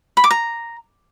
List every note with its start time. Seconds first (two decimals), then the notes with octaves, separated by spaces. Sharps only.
0.17 B5
0.24 D6
0.31 A#5